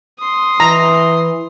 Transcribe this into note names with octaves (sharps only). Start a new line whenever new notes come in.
C6 D#6
E3 A#5